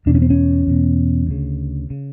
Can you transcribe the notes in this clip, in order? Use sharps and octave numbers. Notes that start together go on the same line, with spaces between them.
E2 B2 D4
C#4
C4
C#4
E2 B2
D2 C#3
C#3